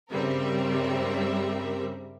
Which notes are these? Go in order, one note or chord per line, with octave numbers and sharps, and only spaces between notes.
G2 C#3 G3 C4 A#4 E5